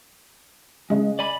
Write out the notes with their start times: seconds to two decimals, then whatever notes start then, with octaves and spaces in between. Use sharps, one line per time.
0.90 C#3 G#3 D#5
1.19 D5 G#5 B5